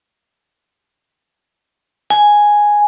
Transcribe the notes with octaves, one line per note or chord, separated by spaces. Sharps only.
G#5